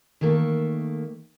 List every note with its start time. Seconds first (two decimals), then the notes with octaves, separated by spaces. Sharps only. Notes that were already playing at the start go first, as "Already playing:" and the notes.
0.21 D#3 A3 A#3 A4